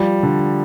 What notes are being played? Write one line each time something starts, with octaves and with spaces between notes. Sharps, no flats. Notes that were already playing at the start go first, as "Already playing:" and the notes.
Already playing: F3 G3
D3